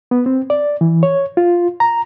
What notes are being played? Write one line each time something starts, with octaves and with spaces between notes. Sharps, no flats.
B3
C4
D5
E3
C#5
F4
A#5